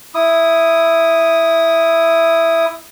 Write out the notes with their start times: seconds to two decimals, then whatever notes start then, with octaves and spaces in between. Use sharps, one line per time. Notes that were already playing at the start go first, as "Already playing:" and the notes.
0.15 E4 D#6